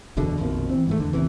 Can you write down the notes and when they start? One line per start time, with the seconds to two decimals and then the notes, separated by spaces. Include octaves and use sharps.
0.17 F#1 E2 B2 D3
0.38 A#1 F2 B2 D#3
0.70 E3 C4
0.87 G#2 E3 A3
0.99 E2 D3
1.13 A1 D#2 C3 E3